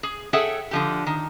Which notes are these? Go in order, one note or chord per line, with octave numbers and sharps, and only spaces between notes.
G#4
G#4 A4 C#5 E5 F#5 G5
D3 F3 G4
D#3